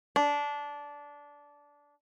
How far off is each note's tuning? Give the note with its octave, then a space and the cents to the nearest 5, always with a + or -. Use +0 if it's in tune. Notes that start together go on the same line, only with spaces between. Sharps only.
D4 -15